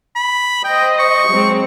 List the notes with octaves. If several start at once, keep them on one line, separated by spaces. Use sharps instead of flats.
B5
C5 D#5 G5
C#6
F#3 G#3 C4